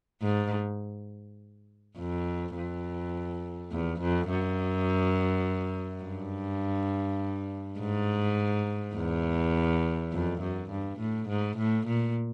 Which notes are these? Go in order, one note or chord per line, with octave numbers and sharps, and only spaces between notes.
G#2
F2
F2
E2
F2
F#2
G2
G#2
E2
F2
F#2
G2
A2
G#2
A2
A#2